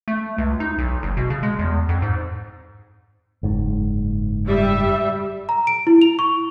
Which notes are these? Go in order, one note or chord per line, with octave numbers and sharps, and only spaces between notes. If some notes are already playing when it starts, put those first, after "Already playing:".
A3
C#2
D#4
B1
F#1
B2
C#3
G#3
E2
F2
G#2
F#1 G#2
G3 E5
A#5
D7
E4
F7
C#6